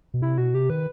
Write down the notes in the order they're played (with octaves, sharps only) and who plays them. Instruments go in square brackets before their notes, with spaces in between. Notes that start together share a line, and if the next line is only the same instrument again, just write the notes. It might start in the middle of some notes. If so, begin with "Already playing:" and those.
[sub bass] B2
[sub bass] C3 [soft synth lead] E4
[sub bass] B2 [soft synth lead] F#4
[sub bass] C3 [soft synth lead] G4
[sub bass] D#3 [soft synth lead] B4